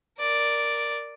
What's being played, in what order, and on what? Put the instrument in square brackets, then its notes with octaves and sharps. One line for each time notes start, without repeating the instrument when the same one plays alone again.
[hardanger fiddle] A#4 D5